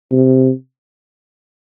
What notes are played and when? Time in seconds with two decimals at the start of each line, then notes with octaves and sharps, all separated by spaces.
0.11 C3